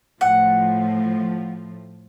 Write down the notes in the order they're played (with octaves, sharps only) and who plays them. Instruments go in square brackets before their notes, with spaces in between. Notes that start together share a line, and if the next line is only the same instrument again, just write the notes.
[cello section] A2 F3 [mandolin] F#5